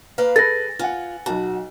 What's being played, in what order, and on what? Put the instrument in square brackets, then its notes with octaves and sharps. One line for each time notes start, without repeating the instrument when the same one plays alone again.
[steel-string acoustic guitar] A#3 B4 F5
[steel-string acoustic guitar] G#4 [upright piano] A4 B4 [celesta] A6 A#6
[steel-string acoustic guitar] F4 [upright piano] F#5 G#5
[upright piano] B1 A5 [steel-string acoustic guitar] F#4